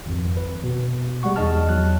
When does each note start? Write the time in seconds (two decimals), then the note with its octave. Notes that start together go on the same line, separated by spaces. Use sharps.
0.06 G#1 F2
0.37 B4
0.64 B2
1.23 G3 G#3 F#5 C#6
1.36 E2 D#4 G#4 D#5 A5 F6
1.69 E2 F#3 A5 F#6